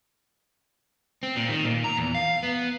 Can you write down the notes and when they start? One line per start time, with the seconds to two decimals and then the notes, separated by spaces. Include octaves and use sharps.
1.23 C4
1.36 A#2
1.49 D#3
1.64 A#2
1.84 A#5
1.97 E2
2.15 F5
2.43 B3